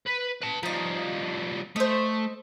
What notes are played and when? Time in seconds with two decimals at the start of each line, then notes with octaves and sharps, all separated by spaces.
0.07 B4
0.42 B4 A5
0.63 F3 G3 D#4 D#5
1.76 A3 C5 D#5